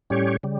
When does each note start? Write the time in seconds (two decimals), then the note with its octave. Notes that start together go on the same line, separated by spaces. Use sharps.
0.10 A2 G3 C#4 G4 C#5
0.43 C#3 G3